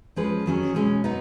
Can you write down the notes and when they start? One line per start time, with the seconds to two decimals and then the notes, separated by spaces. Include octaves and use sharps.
0.16 F3 G#3 C#4 G#4 B4
0.46 D#3 F#3 C#4 G#4
0.75 B2 G#3 C#4
1.04 F#3 B3 D#4